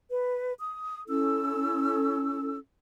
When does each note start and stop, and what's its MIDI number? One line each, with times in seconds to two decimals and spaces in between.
0.10 0.53 71
0.60 1.02 87
1.07 2.56 61
1.07 2.56 64
1.07 2.56 69
1.07 2.56 88